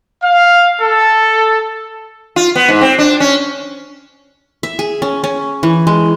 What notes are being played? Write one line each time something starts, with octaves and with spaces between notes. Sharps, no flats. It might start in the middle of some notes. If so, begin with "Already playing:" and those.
F5
A4
F4
B3
G#2
C4
D4
C#4
E5
G#4
C#4
C#4
E3
G#3